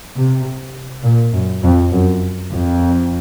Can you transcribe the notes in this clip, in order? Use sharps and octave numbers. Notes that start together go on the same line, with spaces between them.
C3
A#2
F#2
F2
F#2
F2